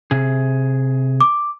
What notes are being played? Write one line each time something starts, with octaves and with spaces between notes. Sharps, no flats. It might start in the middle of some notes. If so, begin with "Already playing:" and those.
C3 G#4
D6